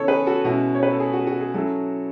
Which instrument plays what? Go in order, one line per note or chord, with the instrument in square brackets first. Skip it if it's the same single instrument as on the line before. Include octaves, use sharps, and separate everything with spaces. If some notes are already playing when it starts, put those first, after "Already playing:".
Already playing: [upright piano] C#3 E3 B3 D4 A4 C#5
G#4 B4
F#4 A4
B2 G#3 C#4 E4 F#4
C#5
B4
A4
G#4
F#4
F#4
G#4
F#3 C#4 E4 F#4 A4